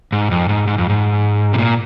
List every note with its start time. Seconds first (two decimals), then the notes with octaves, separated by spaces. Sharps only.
0.12 G#2
0.31 F2
0.49 G#2
0.67 G#2
0.78 F2
0.89 G#2
1.53 C3
1.58 A#2